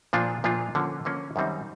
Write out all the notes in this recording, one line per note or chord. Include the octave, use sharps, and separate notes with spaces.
A#2 F3 A#3 D4 F4
A#2 F3 A#3 D4 F4
D3 F3 A#3 C#4
D3 F3 A#3 C#4
F#2 D#3 G3 C4 D#4